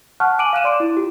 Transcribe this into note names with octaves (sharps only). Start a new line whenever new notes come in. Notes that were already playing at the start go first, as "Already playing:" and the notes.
F#5 A5 C#6 F6 F#6
G#5 D6 D7 D#7 F#7
F5 F#6 D#7 E7
D5 C6 D6 D7
E4
F4 G4